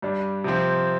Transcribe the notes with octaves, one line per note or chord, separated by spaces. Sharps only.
G2 G3 D4
C3 F3 C4